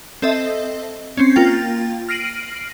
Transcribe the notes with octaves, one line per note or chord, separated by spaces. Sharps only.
C4 A4 D#5 E5
C4 C#4
A#3 F4 G5 A6
F6 A#6 C7 D7 D#7 F#7